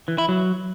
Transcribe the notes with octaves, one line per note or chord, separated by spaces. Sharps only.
E3
E4
F#3